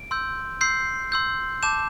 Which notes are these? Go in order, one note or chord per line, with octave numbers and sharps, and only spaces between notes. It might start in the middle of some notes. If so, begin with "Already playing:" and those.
Already playing: D7
C6 E6 G6
C6 E6 G6 C7
C6 E6 G6
A5 D6 G6 E7